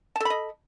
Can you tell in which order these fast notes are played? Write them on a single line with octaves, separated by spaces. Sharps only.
A5 A4 B5 D#5